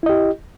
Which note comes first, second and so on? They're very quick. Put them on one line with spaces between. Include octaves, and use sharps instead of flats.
E4 D#5 G4